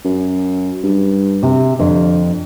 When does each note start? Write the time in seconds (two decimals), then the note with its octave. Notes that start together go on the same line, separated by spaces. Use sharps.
0.05 F#2
0.83 G2
1.43 C3
1.79 F2 D3